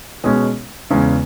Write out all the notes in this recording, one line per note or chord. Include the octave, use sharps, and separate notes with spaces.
B2 G#3 C#4 G#4
E2 C#3 G#3 C#4